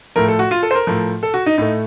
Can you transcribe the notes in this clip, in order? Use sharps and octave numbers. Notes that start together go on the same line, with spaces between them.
A2 F3 A3 A#4
A4
F#4
F4
A4
C5
A#4
A2 F3 A3
A4
F#4
D#4
A2 A3 D#4